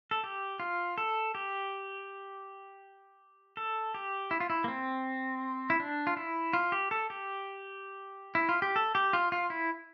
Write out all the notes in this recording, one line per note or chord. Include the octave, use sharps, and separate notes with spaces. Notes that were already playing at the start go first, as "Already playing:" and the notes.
A4
G4
F4
A4
G4
A4
G4
E4
F4
E4
A#3
C4
E4
D4
F4
E4
F4
G4
A4
G4
E4
F4
G4
A4
G4
F4
F4
E4